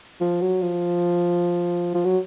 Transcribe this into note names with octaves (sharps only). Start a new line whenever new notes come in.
F3
F#3
F3
F3
F#3